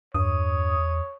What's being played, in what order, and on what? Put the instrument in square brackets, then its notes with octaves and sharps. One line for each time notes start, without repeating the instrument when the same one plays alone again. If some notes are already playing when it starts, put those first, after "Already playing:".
[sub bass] E2 [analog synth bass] G2 [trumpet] C#5 [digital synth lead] D#6